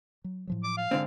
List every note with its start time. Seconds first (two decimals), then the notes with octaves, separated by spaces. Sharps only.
0.24 F#3
0.47 A2 F3 F#3
0.64 D6
0.77 F5
0.91 G#2 D3 C4